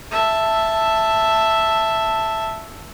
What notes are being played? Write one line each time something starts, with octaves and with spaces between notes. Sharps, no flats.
E5 A5